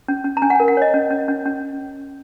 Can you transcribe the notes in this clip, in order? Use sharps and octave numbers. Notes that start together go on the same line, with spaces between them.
C#4
C#4
A#5
C#4 G#5
F#5
A#4 G#5
F#5
C#5 D#5
C#4
C#4
C#4
C#4